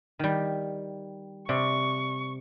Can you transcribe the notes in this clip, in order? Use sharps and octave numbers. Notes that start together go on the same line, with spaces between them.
D#3 G3
C3 D5 C#6